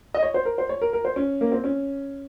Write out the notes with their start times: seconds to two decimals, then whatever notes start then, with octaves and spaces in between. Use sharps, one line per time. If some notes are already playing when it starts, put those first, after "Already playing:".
0.14 D#5
0.22 C#5
0.34 C5
0.45 A#4
0.58 C5
0.69 C#5
0.81 A#4
0.93 A#4
1.05 C5
1.16 C#4
1.41 A#3
1.52 C4
1.64 C#4